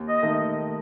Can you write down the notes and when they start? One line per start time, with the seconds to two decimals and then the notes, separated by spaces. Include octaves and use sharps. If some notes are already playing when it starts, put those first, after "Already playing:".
Already playing: D#2
0.08 D#5
0.23 D#3 A3